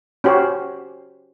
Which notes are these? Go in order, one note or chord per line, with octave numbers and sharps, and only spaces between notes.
C#4 F#4 G4 C5